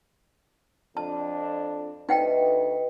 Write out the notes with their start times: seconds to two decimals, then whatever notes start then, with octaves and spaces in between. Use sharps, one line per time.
0.97 F2 D4 A5
2.09 D2 D#4 B4 D#5 F#5 G5